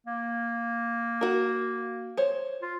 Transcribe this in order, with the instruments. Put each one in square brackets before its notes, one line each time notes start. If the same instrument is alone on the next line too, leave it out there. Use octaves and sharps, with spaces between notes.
[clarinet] A#3
[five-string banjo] F#4 A#4
C5 C#5
[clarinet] F4